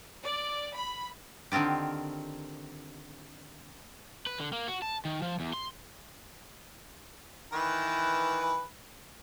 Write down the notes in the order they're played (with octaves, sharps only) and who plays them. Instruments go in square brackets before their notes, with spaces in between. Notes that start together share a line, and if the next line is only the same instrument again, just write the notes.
[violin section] D5
B5
[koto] D3 D#3 C4 F4 G4
[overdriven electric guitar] B4
D3
A#3
F#4
A5
D#3
F3
E2
C6
[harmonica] D#3 E3 B4